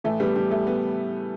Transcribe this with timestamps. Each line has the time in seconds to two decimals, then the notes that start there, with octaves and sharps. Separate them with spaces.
0.04 A2 E3 A3
0.20 G3 B3
0.36 G3
0.51 A3
0.67 B3